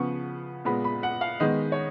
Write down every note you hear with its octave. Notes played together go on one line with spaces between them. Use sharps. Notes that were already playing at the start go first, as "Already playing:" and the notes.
Already playing: C#3 F3 B3 C#6
A#2 G#3 B3 B5
B5
F#5
F5
D#3 G#3 B3 D#5
C#5